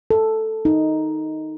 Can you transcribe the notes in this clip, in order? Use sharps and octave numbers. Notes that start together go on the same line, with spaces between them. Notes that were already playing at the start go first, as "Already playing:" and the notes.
A4
D#4